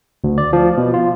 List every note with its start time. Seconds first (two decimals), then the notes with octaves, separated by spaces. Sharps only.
0.24 D2
0.38 D5
0.53 F3
0.77 B2
0.94 F4